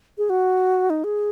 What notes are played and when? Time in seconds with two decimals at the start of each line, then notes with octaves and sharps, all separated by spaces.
0.18 G#4
0.30 F#4
0.90 D#4
1.04 G#4